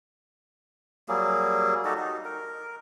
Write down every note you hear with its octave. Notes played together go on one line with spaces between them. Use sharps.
F#3 G3 A#3 G#4
D#4 F#4 G4 A4
D#4
A#4